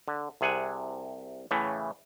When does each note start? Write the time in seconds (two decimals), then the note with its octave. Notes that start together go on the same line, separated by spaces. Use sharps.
0.08 D3
0.41 C2 C3 G#4 F#5 G#5
1.51 A2 C#3 E3 A3